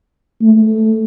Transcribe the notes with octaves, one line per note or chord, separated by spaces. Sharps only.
A3